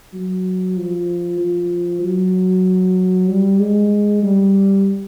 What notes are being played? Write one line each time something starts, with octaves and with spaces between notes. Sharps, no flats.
F#3
F3
F3
F#3
G3
G#3
G3